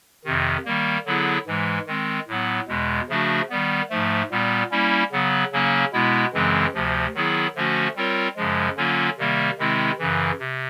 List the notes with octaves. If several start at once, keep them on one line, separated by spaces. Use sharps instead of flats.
F2 C3 D#3
D#3 G3 A#3
D3 F#3 B3 E4 G#4
G#2 E3 G#3
D#3 G#3 C4
A2 F#3 B3
E2 B2 G#3
C#3 F3 A3 D4 F#4
D#3 G3 B3
G#2 F3 A3
A#2 G3 B3
G3 A#3 C#4 E4
C#3 F#3 B3
C#3 F#3 A#3 C#4
B2 G#3 B3 E4
F#2 C#3 E3 G#3 C4
D2 C3 F3
D#3 F#3 B3 E4 G#4
D3 F3 A3 C#4 F#4
G3 C4 F4 A#4 C#5
F#2 C#3 F3 G#3
D3 F#3 A#3 C#4 F4
C3 D#3 G3 A#3
C3 D#3 G#3 C4 E4
F#2 C#3 E3
C3